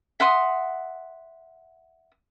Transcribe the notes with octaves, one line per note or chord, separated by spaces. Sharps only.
E5 F#5 C6 D#6